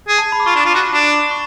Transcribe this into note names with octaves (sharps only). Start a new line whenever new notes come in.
G#4
A5
B5
D6
F4 C#6
D4
D6
F4
F#4 C#6
D4
C#6